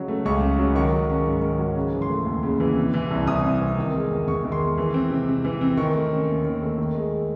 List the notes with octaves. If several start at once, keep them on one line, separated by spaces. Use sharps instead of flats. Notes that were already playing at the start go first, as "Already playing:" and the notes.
Already playing: C#3 F#3 G#3
A3
C#2 C#6
C#3
F#3
D#3 C#6
F#3
C#4
G#2
D#3
F#3
C#3
E3
C6
A3
D#2
C#3
E3
C3
E3
C2
C2 D#6
C3
E3
D#3
G#3
E2
E2 C#6
D#3
C6
G#3
E3
C4
C3
C3
E3
C4
D#3 C#6
A3
C#4
D#2
D#3
A3
D#3
G#3